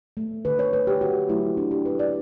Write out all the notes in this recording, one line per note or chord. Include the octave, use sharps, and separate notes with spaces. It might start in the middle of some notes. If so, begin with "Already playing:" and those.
A3
D3 B4
C#5
A3 B4
G4
D3 F#4
F#3 A3 E4
D3 D4
G4
F#3 A3 B4
D5